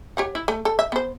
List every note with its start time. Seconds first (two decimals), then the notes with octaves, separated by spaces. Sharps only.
0.17 G4 C#5 F#5
0.35 E4
0.48 A3
0.65 A4
0.79 E5
0.92 B3 C5